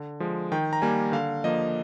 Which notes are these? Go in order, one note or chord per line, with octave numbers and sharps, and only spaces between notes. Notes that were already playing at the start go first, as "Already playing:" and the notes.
Already playing: D3
F3 G#3
D#3 G5
A#5
G3 A#3 G#5
D3 F5
F3 A#3 D#5